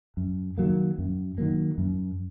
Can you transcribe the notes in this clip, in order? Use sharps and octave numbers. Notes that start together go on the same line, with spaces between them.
F#2
D#3 F#3 A#3
F#2
D#3 F#3 A#3
F#2